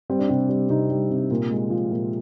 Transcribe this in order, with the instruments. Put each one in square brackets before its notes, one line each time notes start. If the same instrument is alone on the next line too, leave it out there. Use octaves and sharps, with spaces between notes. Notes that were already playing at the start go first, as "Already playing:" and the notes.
[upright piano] G3 C4
D4
C3 C4
G3
C3 D#4
G3
C3
A#2
G#3
F3
A#2